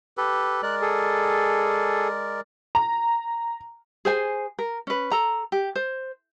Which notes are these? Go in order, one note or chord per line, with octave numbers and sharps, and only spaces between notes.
G4 A4 B4
G#3 A#4 D5 F#6
G#4 A4
A#5
G#4 C5 G#5
A#4
C#4 B4
A4 A#5
G4
C5